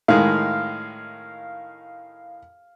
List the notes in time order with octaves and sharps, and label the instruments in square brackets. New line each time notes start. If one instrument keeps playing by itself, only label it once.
[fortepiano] A2 D#3 G#3 [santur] F5